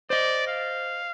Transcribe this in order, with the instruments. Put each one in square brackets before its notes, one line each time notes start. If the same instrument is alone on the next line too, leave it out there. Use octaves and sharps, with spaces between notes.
[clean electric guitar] C5 D#5 [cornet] D5
[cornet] F5